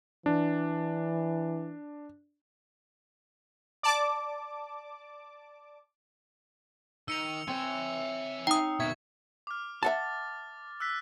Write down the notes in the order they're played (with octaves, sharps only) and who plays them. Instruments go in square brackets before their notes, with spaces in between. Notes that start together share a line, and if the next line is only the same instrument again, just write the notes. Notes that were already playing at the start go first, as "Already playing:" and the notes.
[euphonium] E3 [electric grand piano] D4
[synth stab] D5 A5 D6
[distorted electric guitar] D#3 [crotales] E6 C#7 F7 [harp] D#7
[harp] C4 C#5 [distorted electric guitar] E5 G#5
[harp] D#4 [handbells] G5 D#6
[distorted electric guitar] B2 D#3 [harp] E5 [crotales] C#6 G#6
[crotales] D6 F6
[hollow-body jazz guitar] E5 F#5 A5 [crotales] A6
[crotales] E6 F#6 B6